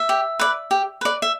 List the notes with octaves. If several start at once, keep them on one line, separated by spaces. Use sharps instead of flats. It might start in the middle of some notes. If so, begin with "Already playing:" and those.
Already playing: E5
G4
B4 D5
G4
B4 D5
E5